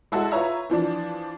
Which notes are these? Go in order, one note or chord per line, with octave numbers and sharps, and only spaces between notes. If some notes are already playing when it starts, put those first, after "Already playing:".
G#3 E4 F#4 A4
F4 B4 C#5 E5 A#5
E3 F3 D4